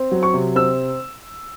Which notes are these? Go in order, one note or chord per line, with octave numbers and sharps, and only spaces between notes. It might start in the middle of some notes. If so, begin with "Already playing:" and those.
Already playing: C4
F#3
C#6
C3
C4 E6